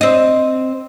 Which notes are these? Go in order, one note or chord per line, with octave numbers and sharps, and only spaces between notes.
C4 D#5